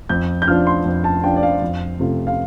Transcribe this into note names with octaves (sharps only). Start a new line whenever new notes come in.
F2 G6
G6
F3 D4 F4 F6
C6
F2
A5
F3 D4 F4 G5
D5
F5
F2
C3 A3 F4
F5